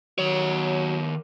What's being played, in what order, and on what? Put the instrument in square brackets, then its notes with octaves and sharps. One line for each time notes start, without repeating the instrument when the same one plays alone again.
[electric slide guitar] D#3 C#5 [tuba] F#3